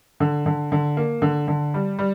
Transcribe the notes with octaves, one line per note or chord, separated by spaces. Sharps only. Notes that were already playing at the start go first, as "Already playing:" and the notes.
D3
D3
D3
A#3
D3
D3
G3
G3